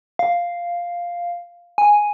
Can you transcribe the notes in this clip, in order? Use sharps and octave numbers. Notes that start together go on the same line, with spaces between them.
F5
G#5